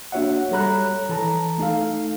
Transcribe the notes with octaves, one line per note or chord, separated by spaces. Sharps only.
A#3 D4 F#4 C#5 E5 F#5
G3 A4 C#5 A#5 B5 F#6
E3 A4 A5 A#5
A3 D#4 A4 F5